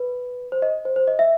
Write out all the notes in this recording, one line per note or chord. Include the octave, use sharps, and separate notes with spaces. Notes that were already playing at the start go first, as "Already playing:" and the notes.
Already playing: B4
C5
D#5
C5
C5
D#5
E5